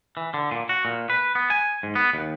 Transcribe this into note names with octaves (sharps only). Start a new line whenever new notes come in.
E3
D3
A#2
F#4
A#2
B4
B3
G#5
G#2
B3
D#2